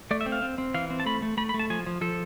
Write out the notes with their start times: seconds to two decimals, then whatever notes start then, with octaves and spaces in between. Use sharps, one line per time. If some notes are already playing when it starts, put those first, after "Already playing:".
0.11 A3 D5
0.21 E5
0.26 C4
0.32 F5
0.42 C4
0.58 C4
0.74 E3 F5
0.90 C4
1.00 A5
1.06 A3 B5
1.22 A3
1.37 A3 B5
1.49 B5
1.54 A3
1.59 A5
1.70 F3 G#5
1.86 F3
2.01 F3 A4